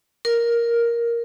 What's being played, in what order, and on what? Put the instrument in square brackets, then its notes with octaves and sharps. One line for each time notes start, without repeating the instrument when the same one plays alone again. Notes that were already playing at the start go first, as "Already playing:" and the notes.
[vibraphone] A#4